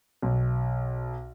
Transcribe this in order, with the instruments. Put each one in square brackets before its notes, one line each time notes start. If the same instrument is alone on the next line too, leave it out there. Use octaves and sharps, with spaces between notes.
[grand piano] B1